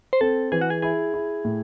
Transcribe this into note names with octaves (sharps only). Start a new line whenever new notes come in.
C5
C4 A4
E3 G#4
F#4
G#4
E4 G#4
E4
A2